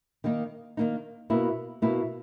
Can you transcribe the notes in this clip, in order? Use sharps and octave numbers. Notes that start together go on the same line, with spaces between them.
D#3 A#3 D#4
D#3 A#3 D#4
B2 A#3 E4
B2 A#3 E4